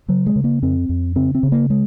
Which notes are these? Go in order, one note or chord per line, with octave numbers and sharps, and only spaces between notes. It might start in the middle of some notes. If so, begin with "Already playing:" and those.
C#3 F#3
G#3
C#3
A#3
F2 C4
F2
C#3 C4
C4
C#3
A#3
G#3